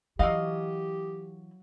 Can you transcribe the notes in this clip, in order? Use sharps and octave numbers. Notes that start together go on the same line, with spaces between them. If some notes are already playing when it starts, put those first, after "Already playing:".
E3 F#3 G4 D#5 F5